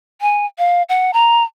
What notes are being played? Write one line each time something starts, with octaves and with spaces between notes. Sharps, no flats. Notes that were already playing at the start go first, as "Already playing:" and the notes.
G#5
F5
F#5
A#5